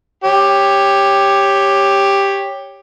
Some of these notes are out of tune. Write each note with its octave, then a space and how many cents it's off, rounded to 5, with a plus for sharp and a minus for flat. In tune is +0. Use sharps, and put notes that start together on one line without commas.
G4 +10 C#5 +0